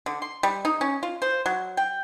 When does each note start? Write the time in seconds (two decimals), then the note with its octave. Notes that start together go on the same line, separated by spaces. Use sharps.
0.06 D3
0.22 C6
0.43 G3
0.65 D#4
0.81 C#4
1.03 F4
1.22 C5
1.46 F#3
1.77 G5